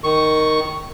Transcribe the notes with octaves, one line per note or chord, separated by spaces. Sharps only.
D#3 C#6